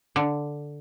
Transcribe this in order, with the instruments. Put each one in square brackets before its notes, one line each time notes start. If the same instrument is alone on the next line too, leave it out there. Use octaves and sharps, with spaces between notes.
[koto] D3